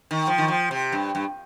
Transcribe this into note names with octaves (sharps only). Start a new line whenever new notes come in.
D#3
F3
D#3
F3
C3
G2
G2